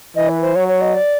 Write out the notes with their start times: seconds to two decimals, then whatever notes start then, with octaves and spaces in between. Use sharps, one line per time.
0.16 E3 D#5
0.29 B4
0.41 C5
0.55 F#3 C#5
0.68 C#5
0.81 D#5
0.95 D5